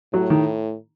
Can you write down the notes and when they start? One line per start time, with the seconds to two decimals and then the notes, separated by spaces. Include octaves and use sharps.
0.13 A2 F#3
0.30 D#3